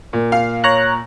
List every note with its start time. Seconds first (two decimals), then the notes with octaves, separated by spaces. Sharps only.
0.13 A#2
0.32 F5
0.64 C#5 A#5 F#6